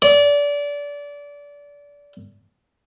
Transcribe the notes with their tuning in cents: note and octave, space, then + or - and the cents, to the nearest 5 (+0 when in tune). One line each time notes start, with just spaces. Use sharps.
D5 -25